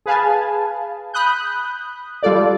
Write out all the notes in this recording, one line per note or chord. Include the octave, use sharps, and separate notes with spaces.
G#4 B4 F5 G#5 A5
B5 D#6 F#6 G6
G3 F4 A4 D5